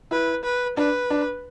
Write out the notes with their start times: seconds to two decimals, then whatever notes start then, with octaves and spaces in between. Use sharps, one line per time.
0.11 E4 B4
0.44 B4
0.77 D4 B4
1.10 D4